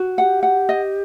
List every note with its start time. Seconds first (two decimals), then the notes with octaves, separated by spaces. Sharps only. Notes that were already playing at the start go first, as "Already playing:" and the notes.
Already playing: F#4
0.17 G4 F#5
0.43 F#5
0.69 D#5